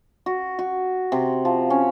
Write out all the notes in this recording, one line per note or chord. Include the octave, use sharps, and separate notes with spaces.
F#4
F#4
C3
F3
C#4